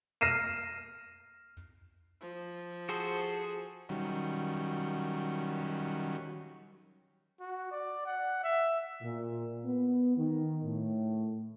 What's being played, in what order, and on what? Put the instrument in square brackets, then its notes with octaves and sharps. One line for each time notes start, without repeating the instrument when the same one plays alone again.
[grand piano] F6 A#6 C7 D#7 E7
[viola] F3
[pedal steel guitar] F#4 A4 C5 [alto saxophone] G#4
[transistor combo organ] D#3 F#3 G3 C#4
[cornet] F#4
D5
F#5
E5
[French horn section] A#2
B3
D#3
A2